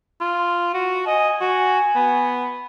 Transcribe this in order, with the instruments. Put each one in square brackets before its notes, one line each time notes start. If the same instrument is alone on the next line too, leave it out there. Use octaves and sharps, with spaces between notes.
[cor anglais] F4
F#4
[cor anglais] D#5 [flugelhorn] G#5
[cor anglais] F#4
B3